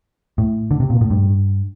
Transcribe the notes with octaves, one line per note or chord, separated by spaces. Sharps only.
A2
D3
C3
A#2
A2
G2